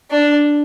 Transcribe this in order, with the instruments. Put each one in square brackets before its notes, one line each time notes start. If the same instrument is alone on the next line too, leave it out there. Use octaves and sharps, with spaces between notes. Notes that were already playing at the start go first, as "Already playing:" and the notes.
[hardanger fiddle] D4